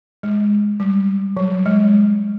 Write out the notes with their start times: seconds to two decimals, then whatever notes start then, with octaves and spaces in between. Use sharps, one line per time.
0.23 G#3
0.80 G3
1.37 F#3
1.52 F#3
1.66 G#3